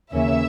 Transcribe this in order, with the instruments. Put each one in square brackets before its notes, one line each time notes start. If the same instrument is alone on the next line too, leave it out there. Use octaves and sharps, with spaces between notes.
[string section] D#2 C#3 E3 A#3 C#4 E5